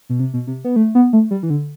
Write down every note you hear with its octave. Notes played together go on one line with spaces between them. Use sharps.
B2
C3
B2
C3
B3
A3
B3
A3
G3
E3
D3